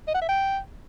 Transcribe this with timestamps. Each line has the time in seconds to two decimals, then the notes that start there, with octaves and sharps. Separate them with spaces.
0.07 D#5
0.14 F#5
0.21 E5
0.29 G5